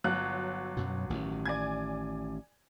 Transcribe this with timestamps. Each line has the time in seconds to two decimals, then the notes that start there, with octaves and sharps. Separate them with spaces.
0.04 G1 F#3 F#6
0.77 F#2 B2
1.10 A1 D#3
1.46 D5 G#5 G#6